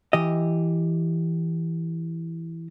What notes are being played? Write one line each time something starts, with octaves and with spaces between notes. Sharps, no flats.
E3 G4 D#5